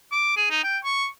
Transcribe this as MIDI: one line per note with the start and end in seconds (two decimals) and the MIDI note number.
0.12 0.36 86
0.36 0.49 68
0.50 0.62 63
0.64 0.78 79
0.84 1.07 85